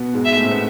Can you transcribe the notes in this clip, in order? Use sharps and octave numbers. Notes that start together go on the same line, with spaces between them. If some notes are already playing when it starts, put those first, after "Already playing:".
Already playing: B2 B3
G#2 G#3
E5
A2 A3
C4
B3